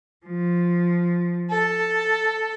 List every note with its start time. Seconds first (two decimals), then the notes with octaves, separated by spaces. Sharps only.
0.25 F3
1.51 A4